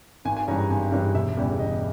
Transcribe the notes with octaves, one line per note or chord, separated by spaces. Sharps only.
G#1 G#5
G#5
G2 E3 G#3 C#4 A#5
A#5
G#1 G#5
G2 E3 G#3 C#4
E1 E5
E2 C#3 G3
E1 D#5